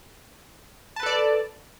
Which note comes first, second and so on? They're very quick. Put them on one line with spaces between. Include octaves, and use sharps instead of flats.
A5 B4 A4 D5